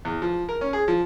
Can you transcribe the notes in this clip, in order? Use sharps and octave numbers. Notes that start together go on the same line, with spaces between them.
E2
F3
A#4
C#4
G#4
F3